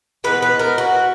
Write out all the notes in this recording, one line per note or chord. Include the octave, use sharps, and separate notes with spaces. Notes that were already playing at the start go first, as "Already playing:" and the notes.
E3 G#3 B3 B4
B4
A#4
F#4